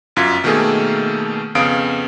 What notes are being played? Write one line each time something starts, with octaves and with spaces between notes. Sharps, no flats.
G1 F#2 F4 G#6 B6
B2 D#3 A3 A#3 G#4 A4
F2 C#3 B3 F5 D#6 D7